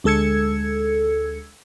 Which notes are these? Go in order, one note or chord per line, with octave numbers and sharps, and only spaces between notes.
D2 G#3 A4 E6 G#6 C#7